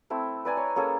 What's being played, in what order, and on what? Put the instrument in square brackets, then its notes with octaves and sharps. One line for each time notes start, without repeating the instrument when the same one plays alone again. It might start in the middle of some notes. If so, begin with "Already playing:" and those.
[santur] A3 C4 E4
B4 D5 G#5 A#5
C#5
A#3 C#4 G#4 A4